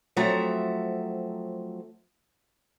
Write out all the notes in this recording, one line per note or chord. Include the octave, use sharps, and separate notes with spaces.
F3 F#3 A3 C4 E5 A#5